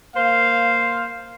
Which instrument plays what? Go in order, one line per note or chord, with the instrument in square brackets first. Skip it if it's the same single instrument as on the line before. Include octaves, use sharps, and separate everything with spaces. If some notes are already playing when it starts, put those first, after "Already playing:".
[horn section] A#3 C5 F5